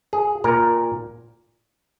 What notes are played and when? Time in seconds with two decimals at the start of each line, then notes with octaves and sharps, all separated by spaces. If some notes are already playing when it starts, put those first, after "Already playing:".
0.13 G#4
0.44 A#2 A#4